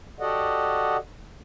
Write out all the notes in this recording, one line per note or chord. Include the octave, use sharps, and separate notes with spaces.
F#4 G4 A4 D5 D#5 F#5